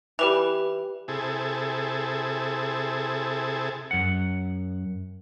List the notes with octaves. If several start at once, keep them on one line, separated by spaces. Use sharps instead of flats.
E3 G3 G4 B4 F7
C3 E4 G#4 A4
F#2 F#5